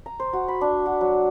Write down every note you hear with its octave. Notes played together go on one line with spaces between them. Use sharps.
A#5
C5
F#4
B5
D4
F#4
F#3